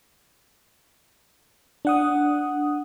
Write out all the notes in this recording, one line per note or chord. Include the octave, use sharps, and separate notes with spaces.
D4 F#5 D#6